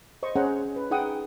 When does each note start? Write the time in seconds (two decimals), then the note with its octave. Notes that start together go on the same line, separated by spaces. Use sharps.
0.23 C5 D#5 C#6
0.36 C#4 G#4 C5 C#5 F#5 A#5
0.76 B4
0.91 D#4 G#4 F#5 G5 D#6